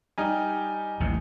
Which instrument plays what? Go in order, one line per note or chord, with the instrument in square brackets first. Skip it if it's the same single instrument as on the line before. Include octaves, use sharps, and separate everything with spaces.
[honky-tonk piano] G3 D#4 G4 [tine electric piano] G#5 A#5 F6
[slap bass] A1 D#2 C3